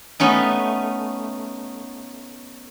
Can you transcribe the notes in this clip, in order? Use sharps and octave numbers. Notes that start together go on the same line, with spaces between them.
A3 B3 C#4 D#4